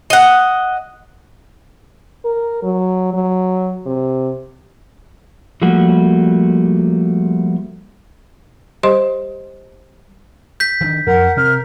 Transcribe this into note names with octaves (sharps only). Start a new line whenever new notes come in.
D#5 F#5
A#4
F#3
F#3
C3
F3 G3 A3 A#3 F#4
G3 G4 C5 D#5 C6
G6 B6
D#3 D4
F2 A#4 F#5
C3 F6